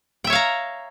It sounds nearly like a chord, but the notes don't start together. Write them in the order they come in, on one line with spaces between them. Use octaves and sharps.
G5 E5 C#5 F5 A#5